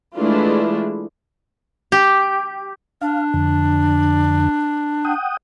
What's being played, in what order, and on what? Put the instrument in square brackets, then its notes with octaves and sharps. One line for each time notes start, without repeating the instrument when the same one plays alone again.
[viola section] E3 G#3 A3 D4 E4 F4
[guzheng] G4
[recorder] D4 [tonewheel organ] F5
[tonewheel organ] F2 D3
F#5 G5 D#6